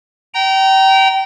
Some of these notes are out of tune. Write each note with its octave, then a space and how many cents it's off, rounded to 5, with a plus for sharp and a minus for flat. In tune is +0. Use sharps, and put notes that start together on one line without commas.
G5 -30 A#5 +0